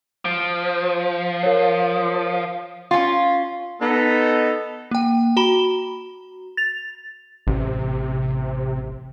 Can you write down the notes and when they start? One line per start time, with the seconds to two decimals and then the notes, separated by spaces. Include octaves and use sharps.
0.25 F3 D7
1.43 A#4 C#5
2.91 C#4 F4
3.81 B3 D#4 A4
4.91 A#3 G5
5.37 F#4 A#5 B5 E7 G7
6.57 A6 F7
7.47 A1 C3